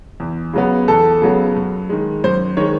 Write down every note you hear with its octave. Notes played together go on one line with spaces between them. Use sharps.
E2
C#3 F#3 B3
E2 A4
C#3 F#3 B3
F#2
D#3 G#3
F#2 C5
D#3 G#3 C#5